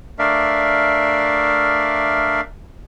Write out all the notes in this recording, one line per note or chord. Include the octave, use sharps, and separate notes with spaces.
A3 D4 A#4 D5 E5 F5